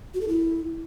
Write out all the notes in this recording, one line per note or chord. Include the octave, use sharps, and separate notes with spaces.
F#4
A4
E4